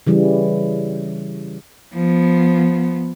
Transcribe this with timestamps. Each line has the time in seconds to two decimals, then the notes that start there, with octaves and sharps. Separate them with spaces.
0.07 C#3 E3 G3
1.94 F3 B3